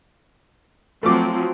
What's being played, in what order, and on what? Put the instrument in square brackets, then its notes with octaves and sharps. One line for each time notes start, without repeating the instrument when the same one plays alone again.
[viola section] F3 F#3 C4 [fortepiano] A3 D6